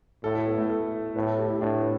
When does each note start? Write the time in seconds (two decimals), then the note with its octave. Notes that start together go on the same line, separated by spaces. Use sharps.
0.24 A2 A4
0.35 E4
0.47 B3
0.58 A3
0.69 A4
1.16 A2 B4
1.26 A4
1.39 G4
1.50 E4
1.61 A2 D4
1.76 B3